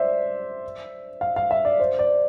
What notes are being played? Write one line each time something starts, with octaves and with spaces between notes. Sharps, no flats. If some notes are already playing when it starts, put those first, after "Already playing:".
Already playing: C5 D5 E5
F5
F5
E5
D5
C5
D5